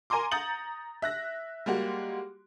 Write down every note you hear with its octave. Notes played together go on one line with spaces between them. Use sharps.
A#4 G#5 A#5 C6 D6
A#5 D#6 G6 A6 C#7 F#7
E5 F#6 A#6
G3 G#3 A#3 F#4